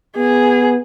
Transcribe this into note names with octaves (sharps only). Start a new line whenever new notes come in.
B3 G#4